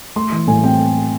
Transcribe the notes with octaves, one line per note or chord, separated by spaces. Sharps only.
A3 C6
E3
A2 G#5
C4 G5